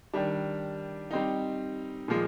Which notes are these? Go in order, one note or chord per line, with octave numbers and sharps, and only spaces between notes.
D#3 G3 D4
G3 C4 D#4
A#2 F3 G#3